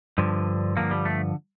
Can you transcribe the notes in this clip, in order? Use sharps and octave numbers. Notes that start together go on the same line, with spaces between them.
G2 D3 F3
G2 D3 F3 A#3
G3
A3